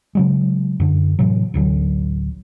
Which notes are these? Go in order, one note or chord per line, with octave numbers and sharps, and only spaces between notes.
C#3 F#3 G#3
F#2 D3
A2 C3 E3 F#3
A1 D2 D3 F#3